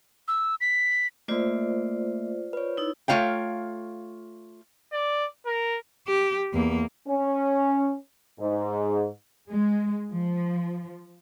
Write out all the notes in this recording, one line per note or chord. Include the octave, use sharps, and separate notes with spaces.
E6
B6
A3 A#3 F4 C5 D5
B4 C#5
D#4 E4
A3 F4 C#5 F5 G5
D5
A#4
G4
E2 A#3
C#4
G#2
G#3
F3